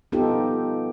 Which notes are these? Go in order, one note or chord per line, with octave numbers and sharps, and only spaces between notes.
B3 D#4 F4 G4 A4